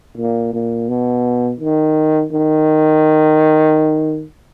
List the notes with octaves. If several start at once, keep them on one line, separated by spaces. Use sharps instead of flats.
A#2
A#2
B2
D#3
D#3